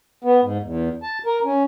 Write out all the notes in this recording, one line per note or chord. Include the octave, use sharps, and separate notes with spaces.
B3
G#2
E2
A5
A#4
C#4